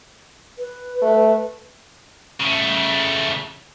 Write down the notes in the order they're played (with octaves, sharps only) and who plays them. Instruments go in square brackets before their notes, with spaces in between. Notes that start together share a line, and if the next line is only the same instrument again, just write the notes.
[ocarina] B4
[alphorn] A3
[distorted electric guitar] C#3 A3